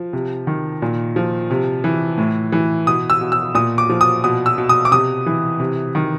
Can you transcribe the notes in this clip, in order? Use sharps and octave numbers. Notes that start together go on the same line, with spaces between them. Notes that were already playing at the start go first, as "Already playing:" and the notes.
Already playing: F3
C3
D#3
A#2
F3
C3
E3
A2
E3
B2 D#6
E6
B2
E6
A#2 D#6
D6
F3
D#6
B2 D#6
E6
B2
D#6
D6
C3 D#6
E3
C3
D#3